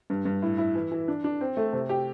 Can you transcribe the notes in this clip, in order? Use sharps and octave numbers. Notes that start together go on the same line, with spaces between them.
G2
G2
A2
E4
E3
E3
D4
D4
C4
A3
C3
G4